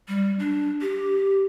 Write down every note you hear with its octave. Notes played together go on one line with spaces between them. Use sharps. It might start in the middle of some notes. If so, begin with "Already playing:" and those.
G3
D4
G4